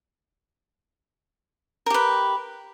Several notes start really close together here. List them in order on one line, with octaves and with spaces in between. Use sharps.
A#4 G4 B4